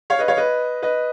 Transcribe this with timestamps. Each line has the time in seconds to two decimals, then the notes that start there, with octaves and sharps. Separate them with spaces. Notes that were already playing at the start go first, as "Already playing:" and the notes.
0.10 C#5 F5
0.19 B4 D#5
0.28 C#5 F5
0.37 B4 D#5
0.82 B4 D#5